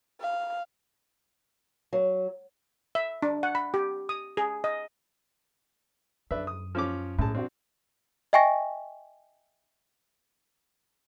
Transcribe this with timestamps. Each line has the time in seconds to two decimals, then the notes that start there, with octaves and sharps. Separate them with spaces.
0.21 F5
1.93 F#3
2.95 E5
3.22 D4
3.43 F#5
3.55 B5
3.74 G4
4.09 D#6
4.37 G#4
4.64 D#5
6.31 F#2 D4 B4 E5
6.47 D#6
6.75 F3 C#4 D6
7.18 F#2 A2 G#4 A5
7.35 C4 D4 F#4
8.33 D#5 E5 G5 G#5 C#6 A#6